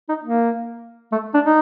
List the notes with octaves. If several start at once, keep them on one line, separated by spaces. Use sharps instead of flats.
D#4
A#3
A3
D4
D#4